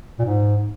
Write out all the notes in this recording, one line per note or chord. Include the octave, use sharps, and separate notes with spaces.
A#2
G#2